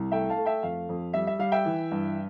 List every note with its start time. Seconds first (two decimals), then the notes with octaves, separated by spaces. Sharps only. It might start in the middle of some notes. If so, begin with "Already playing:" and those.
Already playing: C2
0.11 A3 E5 G5
0.30 F5 A5
0.37 A3
0.46 E5 G5
0.63 F2 F5
0.89 F2
1.13 G3 E5
1.27 E5
1.39 G3 F5
1.52 E5 G5
1.65 E3
1.91 G2